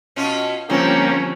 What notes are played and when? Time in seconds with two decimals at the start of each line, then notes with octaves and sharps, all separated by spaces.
0.16 B2 C#4 F4
0.70 D3 F3 G3 A#3 C4 C#4 C6